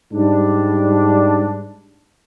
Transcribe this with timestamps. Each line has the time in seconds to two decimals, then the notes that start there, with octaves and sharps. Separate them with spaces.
0.12 G#2 G3 D4